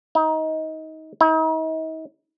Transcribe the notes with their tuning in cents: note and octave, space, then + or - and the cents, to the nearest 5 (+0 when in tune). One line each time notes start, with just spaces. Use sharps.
D#4 +25
D#4 +45